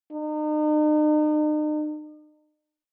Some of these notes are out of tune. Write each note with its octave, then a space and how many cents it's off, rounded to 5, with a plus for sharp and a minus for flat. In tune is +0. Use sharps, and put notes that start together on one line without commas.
D#4 -40